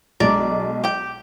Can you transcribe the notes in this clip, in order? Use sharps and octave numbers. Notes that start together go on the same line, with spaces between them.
B1 G#3 D4 D5 A#5
G4 G5